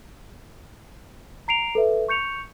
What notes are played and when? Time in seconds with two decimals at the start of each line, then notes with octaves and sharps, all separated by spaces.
1.48 A#5 C7 D7 F7
1.75 A4 B4 E5
2.08 C#6 G6 C#7 F7